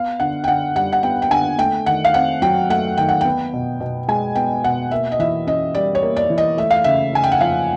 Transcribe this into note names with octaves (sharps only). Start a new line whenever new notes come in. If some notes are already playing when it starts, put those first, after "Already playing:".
Already playing: B3 F5
D3 F#5
G5
D3 F#5
G3 F#5
F#5
B3 G5
G5
D3 G#5
A3 G5
D#3 F#5
F5
C4 F#5
F#3 G5
A3 F#5
D#3 G5
F#5
B3 G5
B2
B2
G#3 G#5
B3 G5
B2 F#5
A#3 E5
D#5
E3 E5
C#4 D#5
G3 D5
C#5
A#3
D5
E3
D#5
A3 E5
F5
C#3 E5
C#3 G#5
G5
F#5
F3 F5